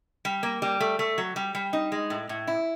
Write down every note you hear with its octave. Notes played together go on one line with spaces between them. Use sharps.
G3
A#3
G3
A3
A3
F#3
G3
G3
D#4
G#3
A2
A2
E4